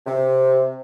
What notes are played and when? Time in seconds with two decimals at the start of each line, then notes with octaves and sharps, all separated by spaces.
0.06 C3